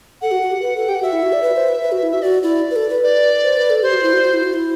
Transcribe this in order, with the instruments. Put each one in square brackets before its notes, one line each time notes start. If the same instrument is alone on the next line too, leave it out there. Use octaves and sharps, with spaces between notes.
[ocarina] A4 [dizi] F#5
[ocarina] F#4
F#4
G4
B4
A4
[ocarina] G4 [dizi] G5
[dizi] F#5
[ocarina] F#4 [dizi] E5
[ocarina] E4
F#4
D5
B4
C5
B4
B4
F#4
E4
[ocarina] F#4 [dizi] E5
[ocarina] F#4 [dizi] D5
[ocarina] E4 [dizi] D5
[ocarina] B4
A4
B4
[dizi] D5
[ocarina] C5
B4
A4
[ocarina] G4 [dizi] C5
[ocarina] F#4
E4
F#4
F#4
E4
F#4
E4